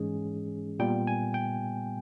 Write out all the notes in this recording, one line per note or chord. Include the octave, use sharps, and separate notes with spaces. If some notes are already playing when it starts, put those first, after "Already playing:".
Already playing: G#2 E3 G#3 C#4 G#4
A#2 G3 B3 G5
G#5
G5